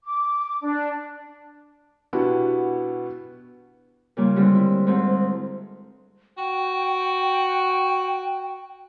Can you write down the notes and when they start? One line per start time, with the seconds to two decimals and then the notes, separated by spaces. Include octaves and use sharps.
0.04 D6
0.61 D4
2.13 B2 B3 D4 E4 F#4 G4
4.17 A#2 C#3 G3 A#3
4.36 D3 G3 G#3 C4
4.55 E4
4.87 D2 G#2 C4
6.38 F#4 G5